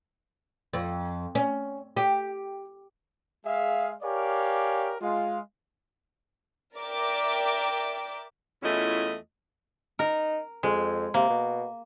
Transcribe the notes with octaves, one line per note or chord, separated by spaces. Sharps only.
F2
C#4
G4
G#3 G#4 E5 F5
G4 A#4 C#5 D5 F5 G#5
G#3 F4 F5
A#4 D5 E5 G5 D6
E2 A3 C#4 E4 F4 D#5
D#4 A#4
F2 G#3
C3 A#3
B2